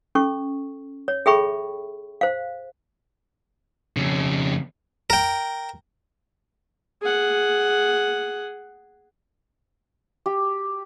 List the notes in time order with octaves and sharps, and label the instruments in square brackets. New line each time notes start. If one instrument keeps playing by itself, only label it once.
[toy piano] C#4 A4 C#6
C#5
G#4 A4 E5 G5 B5 C#6
C5 F5
[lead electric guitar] F2 C#3
[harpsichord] A#4 G5
[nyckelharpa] G#4 F#5
[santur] G4